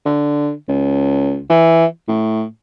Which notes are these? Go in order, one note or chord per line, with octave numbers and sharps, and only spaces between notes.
D3
C#2
E3
A2